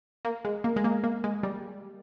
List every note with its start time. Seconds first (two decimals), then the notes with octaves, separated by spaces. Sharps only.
0.25 A#3
0.45 G#3
0.64 A#3
0.76 G#3
0.84 A#3
1.04 A#3
1.24 G#3
1.43 G3